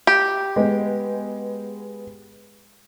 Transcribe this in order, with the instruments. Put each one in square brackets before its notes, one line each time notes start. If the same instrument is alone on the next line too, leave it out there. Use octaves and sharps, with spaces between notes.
[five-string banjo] G4
[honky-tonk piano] G#3 B3